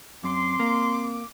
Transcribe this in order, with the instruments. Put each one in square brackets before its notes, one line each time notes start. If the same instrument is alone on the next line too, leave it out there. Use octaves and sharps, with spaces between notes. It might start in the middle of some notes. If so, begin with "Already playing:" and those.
[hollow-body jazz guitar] F#2 [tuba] C4 [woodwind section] C6 [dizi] D6
[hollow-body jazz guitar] A#3